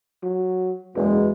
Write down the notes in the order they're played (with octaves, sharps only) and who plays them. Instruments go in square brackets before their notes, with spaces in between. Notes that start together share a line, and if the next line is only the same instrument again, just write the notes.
[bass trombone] F#3
[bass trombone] F#1 [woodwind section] E2 B2 G#3